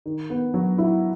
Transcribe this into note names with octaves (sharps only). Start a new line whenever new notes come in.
D#3
B3
F#3
E4